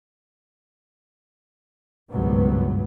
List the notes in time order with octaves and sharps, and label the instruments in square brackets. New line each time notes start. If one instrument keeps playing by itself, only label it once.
[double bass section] G#1 C#2 G2 B2 F#3 B3